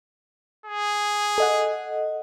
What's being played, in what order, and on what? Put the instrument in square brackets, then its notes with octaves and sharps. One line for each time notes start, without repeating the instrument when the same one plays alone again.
[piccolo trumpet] G#4
[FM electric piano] A4 D#5 F#5